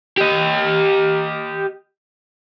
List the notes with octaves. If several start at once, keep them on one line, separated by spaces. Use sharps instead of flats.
G4 D#5